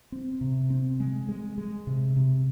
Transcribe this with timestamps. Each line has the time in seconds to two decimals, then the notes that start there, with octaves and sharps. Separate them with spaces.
0.12 C4
0.41 C3
0.70 C4
1.00 G#3
1.29 G#3
1.58 G#3
1.87 C3
2.16 C3